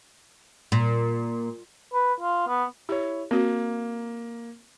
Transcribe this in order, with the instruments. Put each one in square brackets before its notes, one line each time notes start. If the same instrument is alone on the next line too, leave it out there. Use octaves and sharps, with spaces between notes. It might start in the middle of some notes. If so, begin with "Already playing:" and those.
[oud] A#2
[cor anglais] B4
F4
B3
[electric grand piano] E4 C#5 [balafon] G4
[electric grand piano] A#3 [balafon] C4 F#4